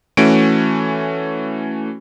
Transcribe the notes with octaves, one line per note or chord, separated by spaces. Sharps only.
E3 A3 C#4 F#4 D7